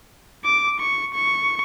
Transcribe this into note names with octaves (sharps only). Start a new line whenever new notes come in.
D6
C#6
C#6